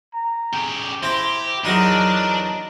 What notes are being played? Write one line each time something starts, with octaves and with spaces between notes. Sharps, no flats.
A#5
C#3 G4
E4 G4 C5 A#5
E2 F#3 D4 D#4 A#4